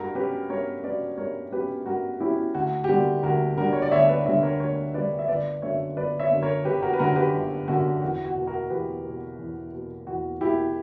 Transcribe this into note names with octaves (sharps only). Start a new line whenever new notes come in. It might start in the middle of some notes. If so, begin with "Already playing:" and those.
Already playing: G2 F#4 A#4
F#3 C#4 G4 B4
G2 A#4 C#5
F#3 C#4 B4 D5
G2 A#4 C#5
F#3 C#4 G4 B4
G2 F#4 A#4
F#3 C#4 E4 G4
D2 F#4
G4
D3 G3 A#3 D4 F#4
D2 F#4 A#4
D3 G3 A#3 D4 F#4 A#4
C#5
D5
D2 C#5 E5
B4 D5
D3 G3 A#3 D4 C#5 E5
A#4 C#5
D2 A#4 C#5
D3 G3 A#3 D4 B4 D5
E5
G1 B4 D5
F#2 D3 A#3 C#5 E5
G1 B4 D5
C#5 E5
F#2 D3 A#3
A#4 C#5
G1 G4 B4
F#4 A#4
B4
F#2 D3 A#3 F#4 A#4
G4 B4
G1
F#2 D3 A#3 F#4
E2 F#4
F#4
B2 A#3
F#4 A#4
E2 G4 B4
B2 A#3
E2
B2 A#3
E2 F#4
B2 A#3 E4 G4